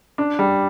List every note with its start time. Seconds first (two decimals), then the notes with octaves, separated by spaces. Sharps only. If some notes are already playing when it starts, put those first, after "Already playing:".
0.18 D4
0.39 G3